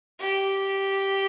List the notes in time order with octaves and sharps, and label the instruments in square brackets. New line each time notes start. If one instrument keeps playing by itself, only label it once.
[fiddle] G4